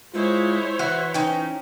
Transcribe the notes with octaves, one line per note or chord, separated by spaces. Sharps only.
G#3 E4 F4 C5 C#5
E3 F#4 E5
C#4 D#4 G5